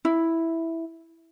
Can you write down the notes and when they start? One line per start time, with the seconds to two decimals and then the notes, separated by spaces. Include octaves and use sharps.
0.05 E4